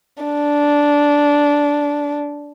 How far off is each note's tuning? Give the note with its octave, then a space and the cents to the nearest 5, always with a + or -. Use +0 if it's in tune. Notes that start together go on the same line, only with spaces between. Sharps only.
D4 -10